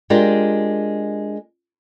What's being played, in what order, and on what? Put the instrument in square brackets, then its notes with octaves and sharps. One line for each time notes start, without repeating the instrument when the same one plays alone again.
[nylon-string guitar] G#3 D4 F4 G4 A#4